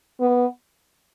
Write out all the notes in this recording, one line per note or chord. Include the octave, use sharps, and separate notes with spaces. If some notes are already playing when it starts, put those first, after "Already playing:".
B3